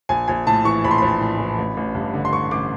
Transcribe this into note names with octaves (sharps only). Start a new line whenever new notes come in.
A#1 G#5
A#1 G#5
A2 A5
E3 C#6
A#1 B5
C6
A#1 B5
A2
E3
A1
A1
G2
D3
C6
A1 C#6
A1 D6